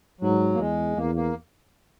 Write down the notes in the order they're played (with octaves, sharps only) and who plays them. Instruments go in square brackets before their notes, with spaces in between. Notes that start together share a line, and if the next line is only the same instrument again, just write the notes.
[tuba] G#2 [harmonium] F#3
[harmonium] A#3
[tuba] E2 [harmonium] G#3
[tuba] E2 [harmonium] A#3
[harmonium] A#3